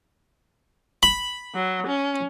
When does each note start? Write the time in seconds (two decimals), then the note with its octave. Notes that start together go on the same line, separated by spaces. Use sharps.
1.03 B5
1.55 F#3
1.87 C#4